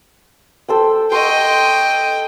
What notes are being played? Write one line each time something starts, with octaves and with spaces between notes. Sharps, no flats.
A4 C5 G5
D#5 F#5 G5 C6 C#6